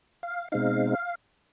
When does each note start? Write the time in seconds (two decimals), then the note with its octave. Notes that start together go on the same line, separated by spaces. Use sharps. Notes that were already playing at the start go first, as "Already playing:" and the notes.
0.23 F5
0.52 B2 G#3 C4 D#4 F5